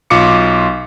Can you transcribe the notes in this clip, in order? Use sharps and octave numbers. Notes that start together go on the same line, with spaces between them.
B1 F4 D6 C#7